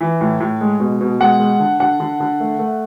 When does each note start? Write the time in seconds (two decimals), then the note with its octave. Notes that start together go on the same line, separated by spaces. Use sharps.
0.01 E3
0.21 A2
0.40 A2
0.61 G#3
0.80 B2
1.01 B2
1.20 G#3 F#5
1.40 G#3
1.60 D3
1.80 D3 F#5
2.00 D3
2.20 D3
2.40 A3
2.59 A3